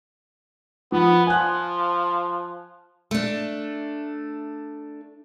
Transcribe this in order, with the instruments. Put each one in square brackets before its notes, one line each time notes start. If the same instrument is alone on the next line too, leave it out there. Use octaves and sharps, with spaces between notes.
[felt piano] F3 [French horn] B3
[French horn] F3 [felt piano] G#5 F#6
[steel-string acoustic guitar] A3 D4